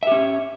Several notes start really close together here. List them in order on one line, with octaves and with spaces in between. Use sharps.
E5 G4 C#4